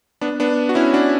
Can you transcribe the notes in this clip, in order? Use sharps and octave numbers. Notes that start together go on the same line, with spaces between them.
B3 D4
B3 D4
F#4
C#4 E4
D4 F#4